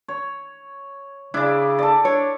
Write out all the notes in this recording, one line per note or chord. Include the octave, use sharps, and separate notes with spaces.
C#5
C#3 D4 E4 D5
A4 D5
D4 C#5